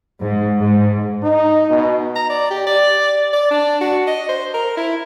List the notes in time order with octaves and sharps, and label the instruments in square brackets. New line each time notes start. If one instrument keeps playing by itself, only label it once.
[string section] G#2
G#2
[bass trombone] D#4 [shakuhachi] D#5
[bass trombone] B2
[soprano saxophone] A#5
D5
G4
D5
D5
D4
F#4
D#5
C5
A#4
E4